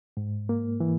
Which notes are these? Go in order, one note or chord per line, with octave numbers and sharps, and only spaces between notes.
G#2
A#3
E3